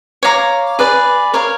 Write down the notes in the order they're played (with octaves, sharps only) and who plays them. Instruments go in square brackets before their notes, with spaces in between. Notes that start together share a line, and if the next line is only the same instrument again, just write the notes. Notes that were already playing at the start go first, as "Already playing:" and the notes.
[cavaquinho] C#5 F5 A#5 D6
G#4 B4 D5
A#4 C#5 F5